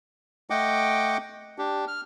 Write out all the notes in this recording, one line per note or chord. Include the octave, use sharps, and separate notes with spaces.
A3 D#5 F#5 G5 D6
D4 G4
F6